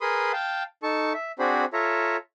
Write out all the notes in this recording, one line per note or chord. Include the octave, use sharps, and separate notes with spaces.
G#4 A#4 B4 B5 C6 D#6
F5 G5 A5
D#4 A4 A5 C#6
E5
C4 D4 F#4 G#4 C5 B5
F4 A4 C#5 E5 A#5